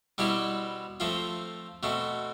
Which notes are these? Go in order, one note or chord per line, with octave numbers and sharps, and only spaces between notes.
B2 G3 C4 E4 G4
F3 A3 C4 F4
B2 A3 C4